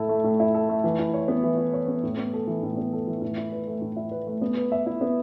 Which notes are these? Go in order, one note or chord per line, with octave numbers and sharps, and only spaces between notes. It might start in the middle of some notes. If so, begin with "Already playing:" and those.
Already playing: A2 E4 A4
A3
A2
E4
A4
A3
E3
E4
C#5
B3
E3
E4
C#5
B3
A2
B3
A4
E3
A2
B3
A4
E3
A2
E4
B4
A3
A2
E4
B4
A3
B3
B4
E5
E4
B3